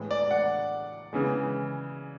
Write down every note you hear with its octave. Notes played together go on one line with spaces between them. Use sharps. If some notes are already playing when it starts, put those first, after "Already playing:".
Already playing: A2 E3 G#3
D5
F#5
C#3 E3 G#3